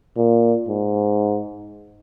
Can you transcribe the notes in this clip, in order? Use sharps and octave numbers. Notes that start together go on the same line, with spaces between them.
A#2
G#2